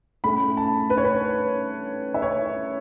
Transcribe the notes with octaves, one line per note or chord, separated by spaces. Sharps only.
A2 A3 C#4 B5
A5
B4
C#5
B4
E5
C#5